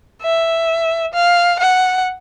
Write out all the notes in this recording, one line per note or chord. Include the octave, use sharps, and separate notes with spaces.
E5
F5
F#5